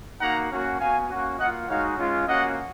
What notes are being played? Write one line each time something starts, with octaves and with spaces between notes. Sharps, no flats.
A#3 D#4 F#4 F#5 A#5
A#3 C#4 F#4
B3 F#4 F5 G#5
A#3 C#4 F#4
A#3 F4 D#5 F#5
G#3 D#4 F#4 C#5 F5
G#3 C#4 F4
A#3 C#4 F#4 D#5 F#5